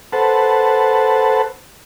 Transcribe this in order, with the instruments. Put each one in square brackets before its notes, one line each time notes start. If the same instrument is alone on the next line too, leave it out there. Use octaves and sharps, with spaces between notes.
[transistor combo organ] A4 B4 C5 F#5 A5